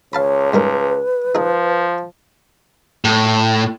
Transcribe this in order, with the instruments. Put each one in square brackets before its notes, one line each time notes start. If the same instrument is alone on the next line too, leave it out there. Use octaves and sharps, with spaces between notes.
[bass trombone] C#2 [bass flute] C#5 [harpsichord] F5 A5 B5
[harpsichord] G#2 G3 A#4 [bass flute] B4
[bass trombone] F3 [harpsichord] D#4 G#4
[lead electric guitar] A2